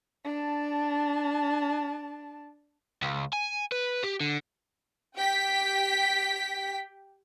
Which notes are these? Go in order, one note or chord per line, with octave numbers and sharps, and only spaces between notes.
D4 A5
C#2
G#5
B4
G4
D3
G4 G5 B6